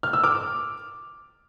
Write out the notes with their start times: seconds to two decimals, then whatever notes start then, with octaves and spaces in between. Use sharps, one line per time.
0.03 F6
0.13 E6
0.23 D6 F6